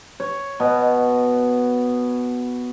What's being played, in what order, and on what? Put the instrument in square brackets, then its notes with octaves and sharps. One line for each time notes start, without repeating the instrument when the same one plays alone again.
[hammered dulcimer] C#5
B2 B3